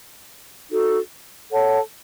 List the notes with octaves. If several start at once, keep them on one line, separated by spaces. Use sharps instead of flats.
D#4 F#4 A4
A4 C#5 F#5 A5